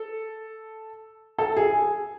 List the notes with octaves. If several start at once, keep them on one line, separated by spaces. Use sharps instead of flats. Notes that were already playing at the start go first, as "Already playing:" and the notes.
Already playing: A4
A4
G#4